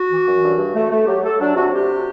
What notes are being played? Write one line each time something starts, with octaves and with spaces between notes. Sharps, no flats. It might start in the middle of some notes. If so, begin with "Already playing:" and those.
Already playing: F#4
E3
F#2
G2
G2
A3
A3
F#3 G4
A3 A4
F#3 D4
C3 F#4
C3 G4